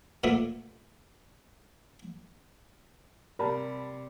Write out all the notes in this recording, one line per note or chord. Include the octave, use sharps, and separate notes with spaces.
A#2 A3 B3 D4
C3 G3 A#4 A5 B5